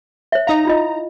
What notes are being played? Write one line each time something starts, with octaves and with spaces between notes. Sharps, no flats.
C#5 E5
D#4 F5 A#5
E4 F4 D#5